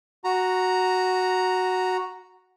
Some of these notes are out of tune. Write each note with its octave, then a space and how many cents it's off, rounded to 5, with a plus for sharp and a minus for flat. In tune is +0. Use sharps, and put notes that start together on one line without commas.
F#4 +0 A#5 +0